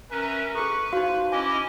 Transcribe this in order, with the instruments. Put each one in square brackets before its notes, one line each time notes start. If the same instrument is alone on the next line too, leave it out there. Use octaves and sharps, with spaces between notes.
[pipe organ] C#4 B4 E5 [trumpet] A#4
[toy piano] G#4 A4 [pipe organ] B4 [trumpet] C#6
[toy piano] D#4 F#4 [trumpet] C5 [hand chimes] F5
[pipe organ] C#4 E4 D#5 [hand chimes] G#5 [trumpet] D6